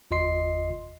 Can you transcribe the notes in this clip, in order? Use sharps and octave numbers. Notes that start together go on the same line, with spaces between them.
G1 E2 F4 D#5 C6 C7